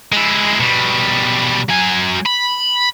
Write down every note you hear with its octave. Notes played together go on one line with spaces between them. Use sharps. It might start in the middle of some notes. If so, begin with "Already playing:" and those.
G#3 E4
B2 G3
F#3 G#5
B5